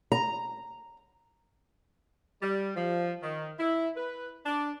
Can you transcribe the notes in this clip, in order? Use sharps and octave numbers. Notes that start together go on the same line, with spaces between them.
A#5
G3
F3
D#3
E4
B4
D4